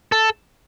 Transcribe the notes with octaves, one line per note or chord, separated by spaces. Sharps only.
A4